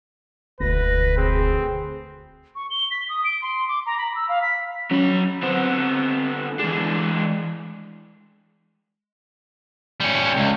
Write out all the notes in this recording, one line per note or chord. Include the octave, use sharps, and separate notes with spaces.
E1 D2 B4 A#6
C4 G#4
C#6
G7
B6
D#6
D7
C6
D6
A#5
B5
E6
F5
B6
F#3 C#4 B5
D3 B3 C4
E3 G#3 D4
G3 C#4
C#2